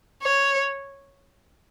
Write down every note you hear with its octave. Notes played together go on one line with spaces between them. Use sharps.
C#5